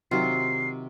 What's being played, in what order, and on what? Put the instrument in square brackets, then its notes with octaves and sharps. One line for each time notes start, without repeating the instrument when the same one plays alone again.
[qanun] C3 [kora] D#3 F#3 F4 [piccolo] C7